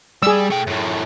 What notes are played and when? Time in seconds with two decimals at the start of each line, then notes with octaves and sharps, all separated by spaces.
0.23 G3 G#4 E6
0.51 A3 G5
0.67 F#2 A2